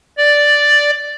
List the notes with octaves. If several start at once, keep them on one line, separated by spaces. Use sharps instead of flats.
D5